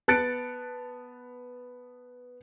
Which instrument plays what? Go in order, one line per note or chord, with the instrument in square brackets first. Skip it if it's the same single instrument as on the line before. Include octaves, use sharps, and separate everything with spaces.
[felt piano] B3 A5 F#6 A6 C#7 D7